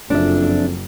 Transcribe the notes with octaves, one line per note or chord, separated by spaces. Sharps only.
F#1 F2 D4 E5